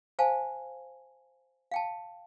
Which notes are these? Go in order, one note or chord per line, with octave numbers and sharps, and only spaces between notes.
C5 F5 G#5 A5
F5 G5 A5